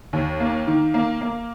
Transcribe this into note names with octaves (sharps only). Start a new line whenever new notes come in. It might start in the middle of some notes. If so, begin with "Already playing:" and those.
D#2
A#3
D#3
A#3
A#3